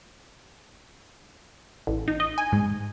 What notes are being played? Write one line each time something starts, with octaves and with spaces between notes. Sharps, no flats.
A1
D#4
D#5
G#5
G#2